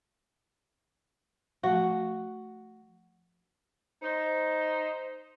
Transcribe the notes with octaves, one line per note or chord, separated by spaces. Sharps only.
F3 A3 F#4
D#4 C5